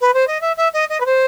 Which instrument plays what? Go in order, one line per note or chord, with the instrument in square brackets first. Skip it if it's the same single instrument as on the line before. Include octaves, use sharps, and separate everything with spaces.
[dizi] B4
C5
D#5
E5
E5
D#5
D#5
B4
C5